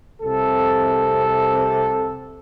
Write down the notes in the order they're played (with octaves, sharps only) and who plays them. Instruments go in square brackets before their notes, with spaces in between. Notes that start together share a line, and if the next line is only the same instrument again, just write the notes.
[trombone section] C2 C3 A4